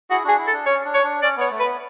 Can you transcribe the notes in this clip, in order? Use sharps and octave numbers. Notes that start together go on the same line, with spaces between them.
E4 F#4 G#4
D4 F#4 G#4
E4
A4
D4
C#4 C#5
D4
C#5
D4
C#4 D5
B3 C#5
A3
B4
B3